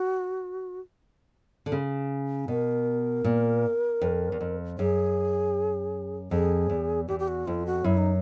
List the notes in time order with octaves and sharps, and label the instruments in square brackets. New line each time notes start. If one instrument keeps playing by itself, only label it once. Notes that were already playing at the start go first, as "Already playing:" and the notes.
Already playing: [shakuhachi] F#4
[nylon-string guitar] D3
C#3
[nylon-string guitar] B2 [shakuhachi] A#4
[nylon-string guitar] A#2
F2
E2
F2
[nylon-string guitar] F#2 [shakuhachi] G#4
[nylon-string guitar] F2 [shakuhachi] G#4
[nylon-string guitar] E2
[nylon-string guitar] E2 [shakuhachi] G4
[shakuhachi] G4
F#4
[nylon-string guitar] F2 [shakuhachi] F4
[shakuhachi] F#4
[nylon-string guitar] F#2 [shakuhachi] E4
[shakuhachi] D#4